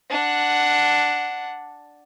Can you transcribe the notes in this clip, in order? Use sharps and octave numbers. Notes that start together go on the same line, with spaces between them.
D4 F#5